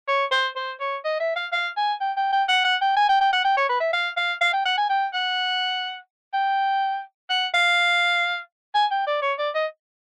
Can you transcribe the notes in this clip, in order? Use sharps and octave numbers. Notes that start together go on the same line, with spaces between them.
C#5
C5
C5
C#5
D#5
E5
F5
F5
G#5
G5
G5
G5
F#5
F#5
G5
G#5
G5
G5
F#5
G5
C#5
B4
E5
F5
F5
F5
G5
F#5
G#5
G5
F#5
G5
F#5
F5
G#5
G5
D5
C#5
D5
D#5